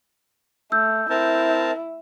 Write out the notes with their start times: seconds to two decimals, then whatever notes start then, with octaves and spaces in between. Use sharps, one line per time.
0.72 A3 E6 G6
1.10 C4 E4 A#4 A5